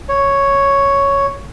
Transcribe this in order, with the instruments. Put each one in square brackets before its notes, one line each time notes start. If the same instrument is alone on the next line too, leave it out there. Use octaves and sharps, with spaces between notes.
[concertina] C#5